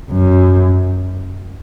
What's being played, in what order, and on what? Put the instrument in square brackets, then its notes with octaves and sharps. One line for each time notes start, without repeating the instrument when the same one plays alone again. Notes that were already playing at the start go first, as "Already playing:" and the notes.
[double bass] F#2